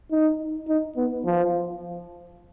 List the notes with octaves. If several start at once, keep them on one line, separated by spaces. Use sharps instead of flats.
D#4
D#4
B3
F3